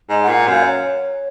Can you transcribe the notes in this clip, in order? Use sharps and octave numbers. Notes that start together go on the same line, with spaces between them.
G#2 D#5
F#5
A#2
F#5
F#2 F5
C#5